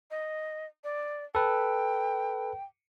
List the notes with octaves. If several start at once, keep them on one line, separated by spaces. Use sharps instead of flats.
D#5
D5
A4 B4 G5